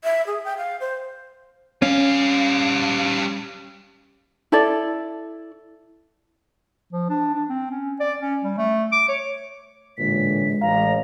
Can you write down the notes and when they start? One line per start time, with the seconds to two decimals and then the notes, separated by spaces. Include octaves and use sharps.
0.04 E5
0.27 G#4
0.45 G5
0.57 F5
0.80 C5
1.82 G3 C#4 F5
4.52 E4 A4 D5
6.93 F3
7.09 D4
7.34 D4
7.49 C4
7.71 C#4
8.00 D5
8.21 C#4
8.44 G3
8.58 A3
8.92 D6
9.09 C#5
9.98 A1 A#2 D3 G#3 B6
10.61 A1 F5 A#5